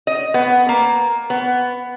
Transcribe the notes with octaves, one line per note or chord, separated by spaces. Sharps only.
D#5
B3
A#3
B3